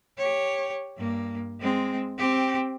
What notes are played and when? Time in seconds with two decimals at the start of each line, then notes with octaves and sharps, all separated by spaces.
0.17 G4 C#5
0.97 G2 A#3
1.60 G#3 C4
2.18 C4 G4